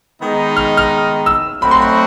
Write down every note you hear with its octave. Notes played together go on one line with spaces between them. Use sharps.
D#3 G#3 B3 D#4
F6
F6
E6
F#3 A3 C4 D#4 F#4 B5
C6
B5